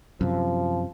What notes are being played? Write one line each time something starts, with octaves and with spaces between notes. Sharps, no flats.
F#2 C3 F3